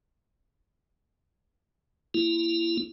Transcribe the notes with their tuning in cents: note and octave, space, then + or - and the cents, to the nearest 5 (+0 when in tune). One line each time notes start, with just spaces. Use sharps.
A#3 +0 E4 +25